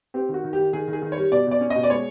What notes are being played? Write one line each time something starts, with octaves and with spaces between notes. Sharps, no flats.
C4 G4
D#3 F#4
D#3
G4
D#3
D#3 G#4
D#3
G#4
D#3
C#5
G3
B2 D5
B2 D5
C#4
D#5
B2
D5
G#3 C#5